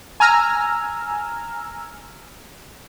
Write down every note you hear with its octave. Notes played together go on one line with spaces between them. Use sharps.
G#5 A#5 E6 F6